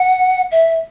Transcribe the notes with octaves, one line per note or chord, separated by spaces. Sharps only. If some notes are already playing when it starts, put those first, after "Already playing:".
Already playing: F#5
E5